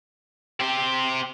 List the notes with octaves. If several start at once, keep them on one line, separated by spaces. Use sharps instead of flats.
C4 G4